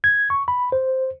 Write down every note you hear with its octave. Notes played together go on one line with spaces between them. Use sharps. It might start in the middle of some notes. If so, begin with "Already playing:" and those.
G#6
C#6
B5
C5